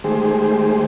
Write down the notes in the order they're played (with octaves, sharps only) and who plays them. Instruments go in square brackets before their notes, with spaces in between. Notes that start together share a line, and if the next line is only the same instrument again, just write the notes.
[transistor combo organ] D#3 G#3 A3 G4 G#4 C5